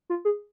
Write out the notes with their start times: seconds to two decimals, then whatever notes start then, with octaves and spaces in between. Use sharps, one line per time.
0.10 F4
0.25 G#4